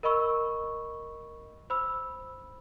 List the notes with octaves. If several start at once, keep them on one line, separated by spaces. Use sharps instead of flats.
A#4 D#5 B5 C#6 E6
C5 B5 E6